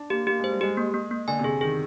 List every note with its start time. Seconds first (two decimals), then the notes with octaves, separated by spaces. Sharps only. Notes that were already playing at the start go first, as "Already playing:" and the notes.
Already playing: D4
0.10 A#3 G4
0.27 A#3 G4
0.39 G#3 C5
0.51 G3
0.61 G#3 G4
0.77 A#3
0.94 A#3
1.11 A#3
1.28 D3 G#5
1.39 C3
1.44 D3 G#4
1.61 D#3 G#4